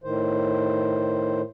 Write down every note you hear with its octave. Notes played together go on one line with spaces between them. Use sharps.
A2 D#3 C5